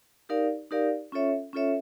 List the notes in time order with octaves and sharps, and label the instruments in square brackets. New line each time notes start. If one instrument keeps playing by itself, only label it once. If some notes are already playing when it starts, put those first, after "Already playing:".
[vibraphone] D#4 G4 A#4 D5 F5
D#4 G4 A#4 D5 F5
C#4 F4 A4 C#5 E5
C#4 F4 A4 C#5 E5